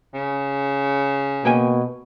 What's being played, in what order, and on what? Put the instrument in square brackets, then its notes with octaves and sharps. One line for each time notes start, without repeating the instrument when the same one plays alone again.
[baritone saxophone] C#3
[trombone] B2 [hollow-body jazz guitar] A#3 G5 G#5